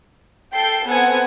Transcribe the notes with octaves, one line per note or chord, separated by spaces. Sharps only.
A4 G5 G6 C7
B3 C4 A4 F#5 G#5